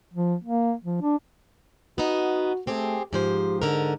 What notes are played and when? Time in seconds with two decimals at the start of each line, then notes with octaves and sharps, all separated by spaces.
0.14 F3
0.44 A#3
0.84 F3
1.02 D4
1.98 B3 D#4 F#4
2.67 A3 C4 G4 G#4
3.13 G#2 F3 G4 C5
3.62 G#2 D3 A#4